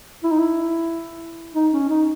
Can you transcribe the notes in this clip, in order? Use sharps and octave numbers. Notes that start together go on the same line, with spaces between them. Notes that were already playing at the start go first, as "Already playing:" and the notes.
E4
D#4
E4
D#4
C#4
D#4